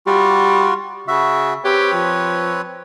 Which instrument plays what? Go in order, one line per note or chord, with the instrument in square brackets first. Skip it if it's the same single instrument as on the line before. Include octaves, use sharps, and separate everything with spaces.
[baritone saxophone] G3 [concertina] F4 F#4
[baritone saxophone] C#3 [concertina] F#4 E5
[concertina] C4 B4 C#5 [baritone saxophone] G4
[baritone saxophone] F3